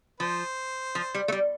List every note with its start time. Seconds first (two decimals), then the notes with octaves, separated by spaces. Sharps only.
0.20 F3 C5
0.95 F3
1.14 G3
1.28 A3
1.32 G3